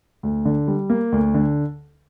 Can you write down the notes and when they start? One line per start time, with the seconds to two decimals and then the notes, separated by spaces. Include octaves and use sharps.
0.23 D2
0.45 D3
0.68 G3
0.90 A#3
1.12 D2
1.34 D3